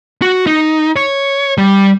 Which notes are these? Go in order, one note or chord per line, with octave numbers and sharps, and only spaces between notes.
F#4
D#4
C#5
G3